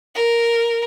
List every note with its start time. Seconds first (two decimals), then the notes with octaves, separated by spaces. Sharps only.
0.15 A#4